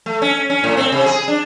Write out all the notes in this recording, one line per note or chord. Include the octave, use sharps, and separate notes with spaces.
A3
C#4
C#4
A2
C4
C3
G#4
D4